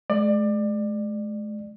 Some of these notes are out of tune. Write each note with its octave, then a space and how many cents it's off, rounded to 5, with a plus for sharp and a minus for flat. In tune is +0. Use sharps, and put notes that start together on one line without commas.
G#3 +45 D5 +25